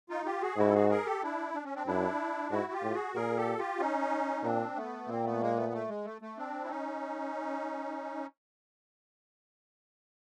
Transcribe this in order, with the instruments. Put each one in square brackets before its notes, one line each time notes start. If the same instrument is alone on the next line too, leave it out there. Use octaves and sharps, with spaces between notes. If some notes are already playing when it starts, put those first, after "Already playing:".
[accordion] D#4 F4
F4 G4
F#4 G#4
[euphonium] G#2 [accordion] E4 F#4
[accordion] A4
F#4 G#4
G#4 A#4
G4 A4
D4 E4
D4
C#4
C4 D4
[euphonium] F#2 [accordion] D4 E4
[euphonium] G#2 [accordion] E4 F#4
[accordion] F4 G4
[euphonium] A2
[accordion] F#4 G#4
[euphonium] A#2 [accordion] G#4 A#4
[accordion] G4 A4
F4 G4
C#4 D#4
[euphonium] A#2 [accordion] C4 D4
[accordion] A3 B3
[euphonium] A#2 [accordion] A#3 C4
[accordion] A3 B3
G#3 A#3
A3 B3
A3
G#3
A3
A3
C4 D4
E4
C#4 D#4